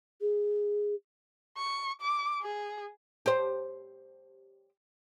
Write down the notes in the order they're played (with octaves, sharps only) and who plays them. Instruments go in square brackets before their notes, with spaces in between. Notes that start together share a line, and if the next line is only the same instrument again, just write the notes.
[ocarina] G#4
[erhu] C#6
D6
G#4
[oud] G4 C5